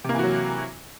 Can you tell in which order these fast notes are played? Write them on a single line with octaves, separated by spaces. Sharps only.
C3 A#3 E3 F#4 F#3